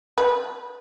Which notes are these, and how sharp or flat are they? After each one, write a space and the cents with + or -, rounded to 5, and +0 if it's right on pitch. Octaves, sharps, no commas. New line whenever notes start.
B4 -20